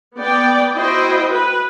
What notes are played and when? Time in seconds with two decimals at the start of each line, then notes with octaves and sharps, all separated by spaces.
0.17 B3 D5 G5
0.76 E4 F#4 C5 D#5 G5
1.30 B4